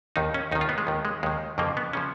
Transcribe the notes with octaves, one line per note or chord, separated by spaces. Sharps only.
D#2 D#3 D#4
C#4
D#2 D#3 D#4
F4
B3
G#3
D#2 D#3
G#3
D#2 D#3 G#3
F2 C#3 F3 A#3
B3
C#3 F3 C#4